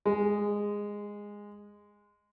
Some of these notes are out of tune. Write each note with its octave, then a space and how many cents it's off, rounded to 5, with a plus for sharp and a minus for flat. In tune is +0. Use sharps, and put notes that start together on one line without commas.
G#3 -10